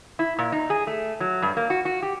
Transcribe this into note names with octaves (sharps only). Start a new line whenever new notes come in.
E4
A#2
D#4
G#4
A3
F#3
G2
A#3
F#4
F#4
G4